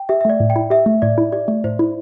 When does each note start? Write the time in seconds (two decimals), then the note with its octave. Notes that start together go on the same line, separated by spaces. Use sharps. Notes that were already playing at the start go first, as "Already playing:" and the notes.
Already playing: G5
0.09 G4 E5
0.21 E5
0.25 A3 D5
0.40 A2
0.50 G5
0.56 E4
0.70 G4 E5
0.86 A3
1.02 A2 D5
1.18 E4
1.32 G4 D5
1.48 A3
1.64 A2 C5
1.79 E4